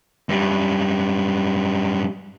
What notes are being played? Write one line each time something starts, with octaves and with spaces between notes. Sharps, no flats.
F#2 G3